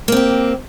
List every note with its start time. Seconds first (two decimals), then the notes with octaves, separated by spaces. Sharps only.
0.08 A#3
0.12 C4
0.17 G4